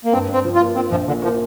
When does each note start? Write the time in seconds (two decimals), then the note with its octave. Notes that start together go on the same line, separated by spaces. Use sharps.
0.05 A#3
0.13 G2 C4
0.28 G2 C4
0.45 F3
0.55 F4
0.60 A#3
0.76 C4 F4
0.91 A#1 F3
1.07 A#2 D3
1.22 F3 A#3